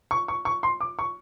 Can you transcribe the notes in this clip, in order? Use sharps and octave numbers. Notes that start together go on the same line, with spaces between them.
C#6
C#6
C#6
C6
D6
C#6